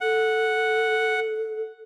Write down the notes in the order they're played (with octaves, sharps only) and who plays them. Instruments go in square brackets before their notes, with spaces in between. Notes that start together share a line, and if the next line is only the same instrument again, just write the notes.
[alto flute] A4 [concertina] F#5